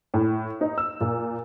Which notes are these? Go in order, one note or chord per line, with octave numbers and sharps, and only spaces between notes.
A2
D#4
E6
A#2